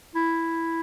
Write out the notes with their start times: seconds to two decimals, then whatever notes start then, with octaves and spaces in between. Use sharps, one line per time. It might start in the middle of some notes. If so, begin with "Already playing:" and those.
0.15 E4